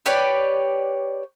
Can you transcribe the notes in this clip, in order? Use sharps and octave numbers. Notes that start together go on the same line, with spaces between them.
G4 B4 C#5 D5